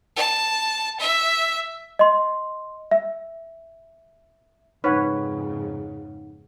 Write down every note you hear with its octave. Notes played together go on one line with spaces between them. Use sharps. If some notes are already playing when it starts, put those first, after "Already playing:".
A5
E5
D#5 C6
E5
F2 G#2 C#3 D#4 B4 C#5 F#5